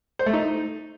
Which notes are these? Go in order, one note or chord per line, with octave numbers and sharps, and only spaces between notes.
C5
A3
D#4